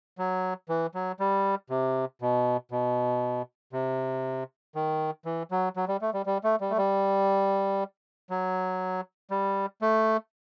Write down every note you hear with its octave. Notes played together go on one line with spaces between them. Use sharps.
F#3
E3
F#3
G3
C3
B2
B2
C3
D#3
E3
F#3
F#3
G3
A3
G3
G3
A3
G3
A3
G3
F#3
G3
A3